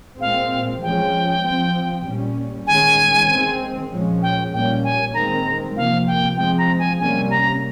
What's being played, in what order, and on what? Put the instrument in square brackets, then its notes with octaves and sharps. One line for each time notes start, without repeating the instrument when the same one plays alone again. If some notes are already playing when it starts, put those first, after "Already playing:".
[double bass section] A#2 G#3 C4 [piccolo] F5
[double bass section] F3 G#3 C#4 [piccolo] G5
[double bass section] F3 C4
A#2 G3 C#4
[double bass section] D#3 G#3 C#4 [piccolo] G#5
[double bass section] D#3 G#3 C4
A#2 F3 G#3 C#4
[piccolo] G5
[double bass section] A#2 G3 A#3 C#4 [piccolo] G5
[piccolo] G#5
[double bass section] D#3 G#3 C4 [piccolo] A#5
[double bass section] C3 F3 A#3 [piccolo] F5
[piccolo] G5
[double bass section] F3 G#3 C4 [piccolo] G5
[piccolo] A#5
G#5
[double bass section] C3 G3 A#3 C#4 [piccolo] G#5
[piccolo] A#5